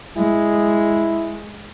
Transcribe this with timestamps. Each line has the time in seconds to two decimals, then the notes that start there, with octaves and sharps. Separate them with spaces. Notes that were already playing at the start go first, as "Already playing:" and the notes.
0.18 G#3 E4